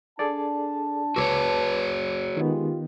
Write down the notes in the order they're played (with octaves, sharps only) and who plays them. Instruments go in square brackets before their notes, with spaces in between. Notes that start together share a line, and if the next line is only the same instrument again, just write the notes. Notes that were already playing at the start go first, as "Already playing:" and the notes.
[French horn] D4 [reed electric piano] G#4 A4 D5 [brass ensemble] A5
[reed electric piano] C#2 D6 E6 [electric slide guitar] F#4 G#4 C#5 [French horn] B4
[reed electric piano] D#3 B3 [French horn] G#3 [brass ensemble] F4 G4